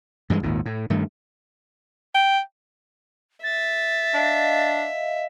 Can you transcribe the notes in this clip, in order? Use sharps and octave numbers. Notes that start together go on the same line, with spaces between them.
G2 E3 F#3 G#3
G#1 D#2 A#2
A2
G2 D#3 A3
G5
E5 A6
D4 D#5 F5